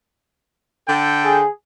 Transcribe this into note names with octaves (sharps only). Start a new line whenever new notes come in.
D3 A4 G5
G#4